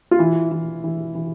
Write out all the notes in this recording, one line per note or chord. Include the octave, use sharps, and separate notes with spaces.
F4
E3 E4
E3
E3
E3